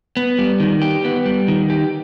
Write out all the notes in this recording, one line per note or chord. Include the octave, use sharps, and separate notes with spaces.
B3
G3
D#3
G4
B3
G3
D#3
G4